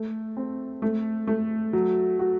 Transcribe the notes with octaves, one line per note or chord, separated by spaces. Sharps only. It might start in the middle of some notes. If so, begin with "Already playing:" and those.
Already playing: A3
C4
A3
A3
F#3
F#4